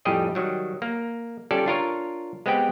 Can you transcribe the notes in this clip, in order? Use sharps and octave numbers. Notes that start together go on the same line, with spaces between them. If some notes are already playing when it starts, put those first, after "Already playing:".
F2 A2 G3 G4 G#4 D#5
D#3 F#3 G3
A#3
G3 C#4 F4 G4 A4 D5
D4 F4 A#4 C#5
G#3 B3 C4 G4 G5